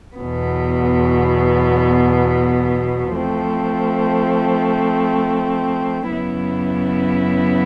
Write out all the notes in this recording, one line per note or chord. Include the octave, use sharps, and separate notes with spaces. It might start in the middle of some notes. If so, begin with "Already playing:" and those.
E2 B2 F#3 B3
F3 A3 C4
F#2 C#3 F#3 B3 E4